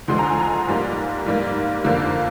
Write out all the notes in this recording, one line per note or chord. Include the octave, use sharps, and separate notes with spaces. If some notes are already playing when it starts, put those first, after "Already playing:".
D2 D3 F3 G#3 C6
A#5
G#5
A#5
G#2 G3 A#3
G#2 G3 A#3
F2 D3 F3 A#3